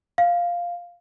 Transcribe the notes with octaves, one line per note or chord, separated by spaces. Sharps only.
F5